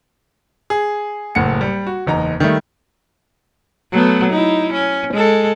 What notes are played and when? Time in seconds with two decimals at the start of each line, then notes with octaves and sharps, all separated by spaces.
0.70 G#4
1.35 F#1 A2 F#5 C#7
1.61 G3
1.87 F#4
2.07 F#1 E2 D#4 A#5
2.40 D#3 G3 A3
3.92 F#3 A3 B3
4.32 D#4 E4
4.73 C#4
5.13 G#3 A4